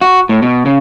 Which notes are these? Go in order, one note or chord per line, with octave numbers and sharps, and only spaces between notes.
F#4
A2
B2
C#3